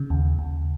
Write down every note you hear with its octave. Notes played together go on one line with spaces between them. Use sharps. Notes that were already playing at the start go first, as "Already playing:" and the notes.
Already playing: C#3
D#2
D#2